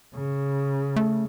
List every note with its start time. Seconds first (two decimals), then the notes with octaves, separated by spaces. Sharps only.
0.14 C#3
0.96 A3